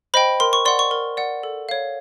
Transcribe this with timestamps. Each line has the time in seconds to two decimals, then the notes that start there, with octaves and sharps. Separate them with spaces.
0.14 C5 D#5 G5 B5
0.40 A#4 C6
0.53 C#6
0.65 D5 F#5 C6
0.79 C#6
0.91 A#4
1.17 D5 F#5
1.43 A4
1.69 C#5 F5